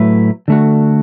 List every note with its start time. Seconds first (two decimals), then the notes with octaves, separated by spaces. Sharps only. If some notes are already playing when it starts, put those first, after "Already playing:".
Already playing: A2 F#3 A3 E4 B4
0.48 D3 A3 F#4